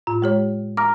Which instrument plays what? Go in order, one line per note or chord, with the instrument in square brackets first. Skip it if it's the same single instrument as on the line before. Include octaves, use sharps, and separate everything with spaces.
[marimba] A2 F4
G#3 G4 C#5
[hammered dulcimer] A#4 [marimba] D6